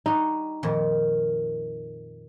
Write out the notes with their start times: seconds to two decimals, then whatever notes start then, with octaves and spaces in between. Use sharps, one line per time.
0.06 G3 D#4 F#4
0.63 F2 A#2 D#3